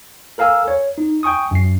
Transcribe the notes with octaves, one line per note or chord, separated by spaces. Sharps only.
A4 A#4 F5 G#5 E6
C#5
D#4
G5 G#5 C#6 D#6
F#2 C7